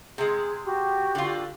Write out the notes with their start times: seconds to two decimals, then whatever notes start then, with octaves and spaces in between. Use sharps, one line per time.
0.18 C3 G#3 G#4
0.64 F#4 G4
1.15 D3 F4